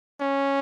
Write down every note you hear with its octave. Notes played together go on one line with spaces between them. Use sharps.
C#4